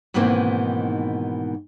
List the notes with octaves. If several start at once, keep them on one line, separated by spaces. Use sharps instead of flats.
G#2 B2 D#3 E3 A#3 C4